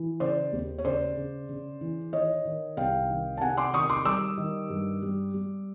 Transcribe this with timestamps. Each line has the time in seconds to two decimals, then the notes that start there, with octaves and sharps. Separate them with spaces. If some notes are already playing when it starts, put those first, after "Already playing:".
Already playing: E3
0.20 C#3 C5 D5
0.53 D#2
0.78 C#5
0.85 C#3 C5 D5
1.17 C#3
1.49 C#3
1.81 E3
2.13 D#3 C#5 D#5
2.45 D#3
2.77 C2 F5 G5
3.10 D#3
3.37 A5
3.41 C3 F#5 G#5
3.57 C6 D6
3.74 D#3 C#6 D#6
3.89 C6 D6
4.05 G3 D6 E6
4.38 D#3
4.70 G2
5.02 G3
5.34 G3